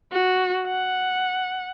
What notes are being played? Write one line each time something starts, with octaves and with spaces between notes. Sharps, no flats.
F#4
F#5